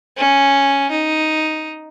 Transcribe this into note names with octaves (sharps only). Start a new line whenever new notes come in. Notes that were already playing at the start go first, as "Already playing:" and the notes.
C#4
D#4